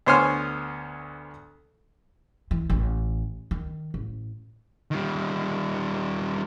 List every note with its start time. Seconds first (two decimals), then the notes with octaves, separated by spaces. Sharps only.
0.06 D2 B3 C5 C#5 G#5 F6
2.51 E3
2.70 A1
3.51 D#3
3.94 A1
4.91 D#3 G3